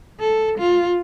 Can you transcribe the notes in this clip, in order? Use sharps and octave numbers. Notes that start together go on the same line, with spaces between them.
A4
F4